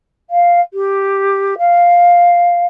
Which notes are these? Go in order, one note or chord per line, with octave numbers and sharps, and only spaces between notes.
F5
G4
F5